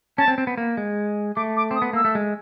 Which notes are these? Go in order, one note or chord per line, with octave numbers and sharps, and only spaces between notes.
C#4 A5
C4
C4
B3
A#3
G#3
A3 D6
D6
C4 D#6
B3
A#3 E6
A3
G#3